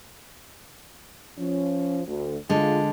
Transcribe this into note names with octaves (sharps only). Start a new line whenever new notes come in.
F3 C#4
D2
D3 G#3 F4